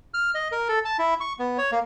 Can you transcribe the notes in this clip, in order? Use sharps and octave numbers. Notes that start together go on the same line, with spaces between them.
F6
D#5
A#4
A4
A5
E4
C#6
B3
C#5
A#3